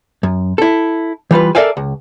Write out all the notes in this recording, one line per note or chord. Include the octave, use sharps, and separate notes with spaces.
F#2
E4 A4
E3 G3 F4 B4
A4 A#4 D5 E5 F5 G#5
C#2